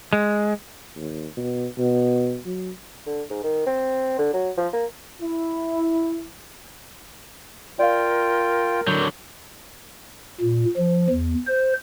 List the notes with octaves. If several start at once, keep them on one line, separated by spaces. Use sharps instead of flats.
G#3
D#2
B2
B2
F#3
D3
G#2
D#3
C4
D3
F#3
F3
A#3
E4
F4 A#4 D5 F5 G5
D3 F#3 G6
A#2
F3
E2
C5